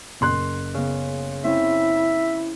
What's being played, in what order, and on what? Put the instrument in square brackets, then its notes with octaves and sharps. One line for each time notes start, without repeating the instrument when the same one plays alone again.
[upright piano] F#1 C6 F#6
[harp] C#3 B3
[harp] C4 C#4 [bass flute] E4 [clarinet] E5